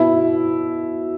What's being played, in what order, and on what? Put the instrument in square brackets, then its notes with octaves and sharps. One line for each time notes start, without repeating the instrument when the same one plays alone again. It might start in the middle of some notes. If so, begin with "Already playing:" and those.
Already playing: [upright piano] B2 E4